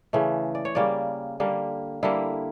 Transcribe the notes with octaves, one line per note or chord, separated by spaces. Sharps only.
C#3 E3 A3
D5
C#5
C#3 G3 A#3 D5
D3 G3 A#3
D3 G3 A#3 E4